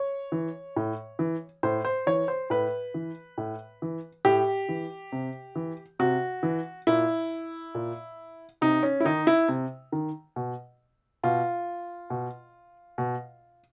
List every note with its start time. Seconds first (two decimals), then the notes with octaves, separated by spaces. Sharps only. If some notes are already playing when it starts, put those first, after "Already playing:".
Already playing: C#5
0.32 E3
0.76 A2
1.19 E3
1.63 A2 C5
1.85 C5
2.07 E3 C#5
2.28 C5
2.50 A2 B4
2.94 E3
3.38 A2
3.82 E3
4.25 A2 G4
4.69 E3
5.12 C3
5.55 E3
5.99 C3 F#4
6.43 E3
6.87 A#2 E4
7.75 A#2
8.61 C3 D#4
8.83 C#4
9.00 E4
9.05 D#3 D#4
9.27 E4
9.48 C3
9.92 D#3
10.36 B2
11.23 B2 F4
12.10 B2
12.98 B2